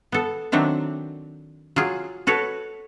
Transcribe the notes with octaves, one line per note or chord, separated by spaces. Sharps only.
B3 A4
D#3 F#3 C4 D4 E5
F#3 F4 G#4
F#4 A4 B4 C#5